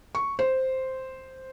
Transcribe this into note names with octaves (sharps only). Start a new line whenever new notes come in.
C#6
C5